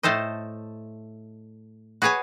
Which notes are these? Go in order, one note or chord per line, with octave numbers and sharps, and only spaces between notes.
A2 A3 A4 C5 D#5
F#4 G#4 B4 C#5 G#5